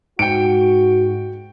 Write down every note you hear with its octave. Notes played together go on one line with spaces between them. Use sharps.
G#2 F#4 G5 C#7 D7